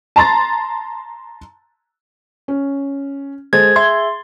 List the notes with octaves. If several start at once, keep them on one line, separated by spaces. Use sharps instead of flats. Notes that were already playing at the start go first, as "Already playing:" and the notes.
A5 A#5 C6 A6
C#4
G#3 G#4 A4 C5 G#6 A6
G#4 E5 C6 G#6